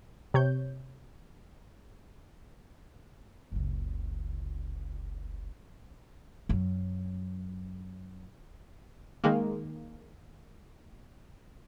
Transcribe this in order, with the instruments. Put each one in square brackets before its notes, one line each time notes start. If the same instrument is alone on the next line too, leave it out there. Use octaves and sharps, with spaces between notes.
[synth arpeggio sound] C3 C#5 G6
[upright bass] F#1 C#2
F#2 F#3
[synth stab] D#3 G#3 A#3